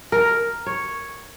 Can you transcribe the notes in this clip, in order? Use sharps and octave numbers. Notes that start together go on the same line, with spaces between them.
A#4
C#5